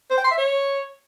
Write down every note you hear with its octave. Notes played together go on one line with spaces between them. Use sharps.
C5
G5
C6
E5
C#5